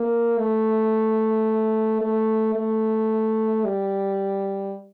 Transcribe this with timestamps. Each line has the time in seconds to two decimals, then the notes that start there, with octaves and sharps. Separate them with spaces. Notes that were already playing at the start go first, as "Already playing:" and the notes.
Already playing: A#3
0.38 A3
2.01 A3
2.55 A3
3.65 G3